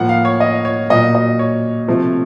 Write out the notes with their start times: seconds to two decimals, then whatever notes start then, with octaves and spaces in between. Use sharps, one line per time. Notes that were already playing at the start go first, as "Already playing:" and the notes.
Already playing: A2 F3 A#3 F#5
0.09 F5
0.25 C#5
0.40 D#5
0.65 C#5
0.90 A#2 F#3 A#3 D#5
1.15 D#5
1.39 C#5
1.88 C3 F3 A3